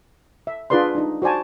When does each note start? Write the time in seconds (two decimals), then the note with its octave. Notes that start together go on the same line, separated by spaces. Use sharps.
0.47 E5
0.70 D4 F4 G#4 B4 D5 C6
0.95 D4 D#4
1.22 F#4 C5 D5 G#5 A5